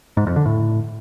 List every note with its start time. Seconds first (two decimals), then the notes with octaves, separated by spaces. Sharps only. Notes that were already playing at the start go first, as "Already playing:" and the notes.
0.17 G#2
0.27 F2
0.36 D3
0.46 A2